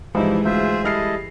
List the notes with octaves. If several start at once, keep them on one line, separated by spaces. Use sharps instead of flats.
G#2 E3 F3 G3 G#3 D#4 E4
D2 F4 G#4 C5 E5
G3 E4 A4 D#5 F6 C7